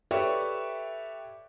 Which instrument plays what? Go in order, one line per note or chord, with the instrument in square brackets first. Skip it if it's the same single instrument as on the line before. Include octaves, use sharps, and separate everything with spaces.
[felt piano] G4 A4 B4 C#5 D5 E5